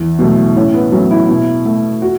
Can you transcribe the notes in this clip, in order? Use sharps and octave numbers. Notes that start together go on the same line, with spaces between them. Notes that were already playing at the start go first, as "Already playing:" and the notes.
Already playing: E2
B2 F#3 A3
A2 C#4
B3
F#3 A3 C#4
E4
B2
A3
F#4